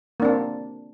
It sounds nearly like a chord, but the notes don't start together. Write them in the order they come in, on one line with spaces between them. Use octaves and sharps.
A#3 D4 C4